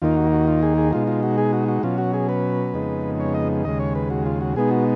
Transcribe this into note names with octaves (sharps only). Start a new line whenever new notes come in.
D#2 D#3 A#3 D#4 F4
F#4
F#4
F4
G#4
G#4
B2 G#3 D#4 F4
F4
F#4
G#4
F#4
F#4
B2 F#3 C#4 F4
F#4
G#4
B4
F2 C#3 G#3 B3 D#4
C#5
D#5
D#2 C#3 G#3 D#5
C#5
B4
F#4
F4
F#4
B2 G#3 B3 D#4 G#4
F#4